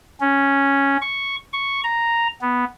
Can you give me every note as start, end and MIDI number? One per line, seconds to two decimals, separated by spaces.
0.21 0.97 61
1.02 1.36 85
1.53 1.81 85
1.84 2.28 82
2.41 2.64 59